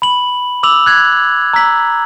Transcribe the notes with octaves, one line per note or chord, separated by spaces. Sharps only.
B5 F#7
D6 E6 F7 F#7
F#6 G#6
A#5 E6 B6 F#7